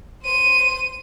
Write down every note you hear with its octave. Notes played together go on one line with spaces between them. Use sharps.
C5 D#7